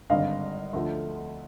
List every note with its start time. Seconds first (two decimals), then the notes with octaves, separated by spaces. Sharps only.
0.09 G#1 G2 D3 D#5 F5
0.73 D2 D3 F3 A3